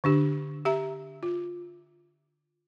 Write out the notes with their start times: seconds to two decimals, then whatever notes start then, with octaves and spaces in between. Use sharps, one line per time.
0.04 D3 D4 G4
0.65 G4 E5 A#5
1.23 F4